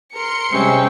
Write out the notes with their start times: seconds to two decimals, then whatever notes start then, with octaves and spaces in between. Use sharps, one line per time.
0.15 A#4 C6 C#7
0.52 C3 G3 G#3 C4 C#4 G5